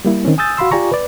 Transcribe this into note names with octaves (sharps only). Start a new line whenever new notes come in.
G3 A#3 E4
D#3 C4 C#4
G#5 D#6 E6 G6 A6
F#4 F5 B5 C6 E6
F4 G4 D5 G#5 A#5 C#6
B4 D5